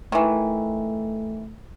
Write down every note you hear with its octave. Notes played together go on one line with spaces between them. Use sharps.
D#3 E3 A3